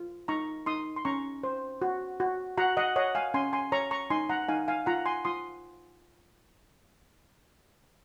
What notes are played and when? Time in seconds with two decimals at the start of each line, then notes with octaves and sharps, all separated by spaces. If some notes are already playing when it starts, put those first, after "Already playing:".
Already playing: F4
0.28 D#4 A#5 C#6
0.66 D#4 C6 D#6
0.96 C6
1.05 C#4 A#5 C#6
1.44 C5
1.82 F#4
2.20 F#4
2.57 F#4 F#5 A#5
2.77 D#5 F#5
2.96 C#5 D#5 F#5
3.15 F5 G#5
3.34 C#4 G#5 C6
3.53 G#5 C6
3.72 C#5 A#5 C#6
3.91 A#5 C#6
4.10 D#4 G#5 C6
4.29 F#5 A#5
4.49 D#4 F5 G#5
4.68 F5 G#5
4.86 F4 F#5 A#5
5.06 G#5 C6
5.25 F4 C6 D#6